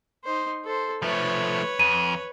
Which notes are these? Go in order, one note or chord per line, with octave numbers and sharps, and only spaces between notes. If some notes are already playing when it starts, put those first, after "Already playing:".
D#4 C5
A4 C5
F3 A3 B4 C#5
F2 D#7